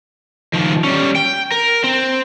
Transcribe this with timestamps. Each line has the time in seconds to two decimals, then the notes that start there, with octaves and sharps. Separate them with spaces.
0.53 D#3 F3
0.84 G3 C#4
1.16 G5
1.52 A#4
1.84 C4